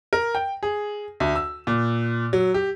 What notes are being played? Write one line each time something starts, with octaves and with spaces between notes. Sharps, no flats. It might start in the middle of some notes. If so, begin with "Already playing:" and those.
A#4
G5
G#4
D2
E6
A#2
F#3
G4